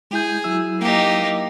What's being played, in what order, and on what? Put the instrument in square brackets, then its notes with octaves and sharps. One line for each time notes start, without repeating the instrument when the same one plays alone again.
[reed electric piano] G#3 E4 G6 [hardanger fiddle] G#4
[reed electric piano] F#3 E4 E6
[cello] A#3 [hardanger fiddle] D#4 G4